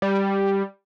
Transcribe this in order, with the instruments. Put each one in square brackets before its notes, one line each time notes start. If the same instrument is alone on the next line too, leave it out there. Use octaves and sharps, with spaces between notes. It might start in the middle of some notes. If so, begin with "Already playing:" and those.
[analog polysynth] G3